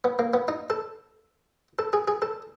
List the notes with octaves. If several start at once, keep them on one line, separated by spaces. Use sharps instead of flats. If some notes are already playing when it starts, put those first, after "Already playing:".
B3
A#3
B3
D#4
A4
A4
G#4
G#4
A4